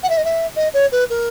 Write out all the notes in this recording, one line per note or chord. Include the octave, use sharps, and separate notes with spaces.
F#5
E5
D#5
E5
D#5
C#5
B4
A#4